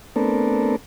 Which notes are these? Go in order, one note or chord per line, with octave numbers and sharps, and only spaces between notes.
A3 B3 C4 D4 A4 A#4